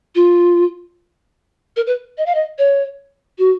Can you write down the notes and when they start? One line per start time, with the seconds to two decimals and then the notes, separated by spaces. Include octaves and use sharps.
0.15 F4
1.77 A#4
1.87 B4
2.18 D#5
2.26 F5
2.35 D#5
2.58 C#5
3.39 F#4